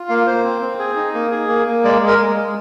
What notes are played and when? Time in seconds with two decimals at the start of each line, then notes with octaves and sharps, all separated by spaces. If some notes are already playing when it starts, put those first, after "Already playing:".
Already playing: F4
0.09 A#3 F5
0.27 A#3 C5
0.44 C4
0.62 C4
0.79 G#4
0.96 D#4
1.14 A#3
1.31 G#4
1.49 A#3
1.66 A#3
1.84 G#3 D5
2.02 G#3
2.07 A#4
2.19 G#3
2.36 G#3